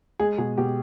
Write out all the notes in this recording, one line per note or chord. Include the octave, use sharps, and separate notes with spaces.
G#3 G#4
B2 G#4
B2 G4